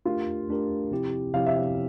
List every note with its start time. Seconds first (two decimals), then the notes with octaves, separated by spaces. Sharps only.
0.05 A3 D4 F4 G4 A#4
0.49 A3 D4 G4 A#4
0.91 C3 F3 C4 E4 G4
1.34 C3 F3 C4 E4 G4 F5
1.46 E5
1.57 F5